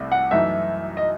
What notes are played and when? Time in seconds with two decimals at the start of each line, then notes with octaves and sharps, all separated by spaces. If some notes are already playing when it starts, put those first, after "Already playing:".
Already playing: C2 C3 A3
0.12 F#5
0.31 F#2 E3 A3 D#4 E5
0.97 D#5